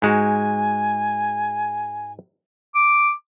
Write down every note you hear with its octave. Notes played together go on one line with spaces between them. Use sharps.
G#2 G#3 F#4 G#5
D6